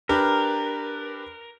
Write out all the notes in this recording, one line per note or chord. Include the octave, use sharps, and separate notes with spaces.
D4 G4 A#4 B4